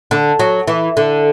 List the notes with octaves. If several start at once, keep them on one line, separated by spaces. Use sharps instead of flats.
D3
F#3
E3
D3